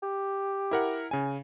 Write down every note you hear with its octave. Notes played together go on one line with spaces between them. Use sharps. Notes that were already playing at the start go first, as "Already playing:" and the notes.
G4
E4 A#4 F#5
C#3 G#5